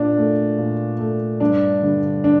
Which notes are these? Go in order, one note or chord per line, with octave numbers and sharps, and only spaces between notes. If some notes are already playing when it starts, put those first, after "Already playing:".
Already playing: A#2 D4
A3
A#2
A3
G2 D4
D3 G3
D4